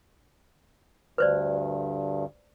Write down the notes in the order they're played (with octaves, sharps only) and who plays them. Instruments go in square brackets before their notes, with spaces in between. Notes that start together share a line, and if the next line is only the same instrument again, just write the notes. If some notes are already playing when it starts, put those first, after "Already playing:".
[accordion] D2 G2 [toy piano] B4 C5 D5